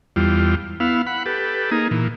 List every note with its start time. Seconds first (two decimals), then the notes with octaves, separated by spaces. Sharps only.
0.16 E2 G3 F4
0.80 B3 E4 F5
1.07 F#5 B5
1.26 G4 A4 B4
1.71 A#3 D#4 G#4
1.91 A#2 E3